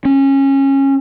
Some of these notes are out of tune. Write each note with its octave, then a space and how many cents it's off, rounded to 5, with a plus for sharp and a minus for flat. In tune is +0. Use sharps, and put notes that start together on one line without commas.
C#4 -20